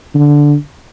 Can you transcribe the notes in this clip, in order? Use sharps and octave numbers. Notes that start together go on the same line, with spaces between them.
D3